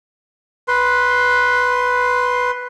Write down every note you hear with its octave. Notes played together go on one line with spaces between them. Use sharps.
B4 C6